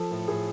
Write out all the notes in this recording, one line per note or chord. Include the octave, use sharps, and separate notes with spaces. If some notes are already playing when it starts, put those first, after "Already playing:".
Already playing: F3 A4
A2
A2 G#4